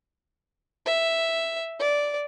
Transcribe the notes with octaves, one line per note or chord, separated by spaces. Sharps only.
E5
D5